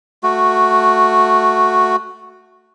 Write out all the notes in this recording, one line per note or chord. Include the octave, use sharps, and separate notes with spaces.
A3 F#4